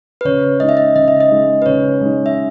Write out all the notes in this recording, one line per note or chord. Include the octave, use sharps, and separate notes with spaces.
B4
C#3 C#5
G#3 D#4 D#5
E5
D#5
C#3 D#5
E5
D#5
G#3 D#4
B4
C#3 C#5
G#3 D#4
E5